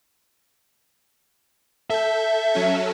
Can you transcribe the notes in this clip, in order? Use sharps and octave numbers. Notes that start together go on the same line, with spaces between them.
A4 E5 G6
F#3 C#4 A4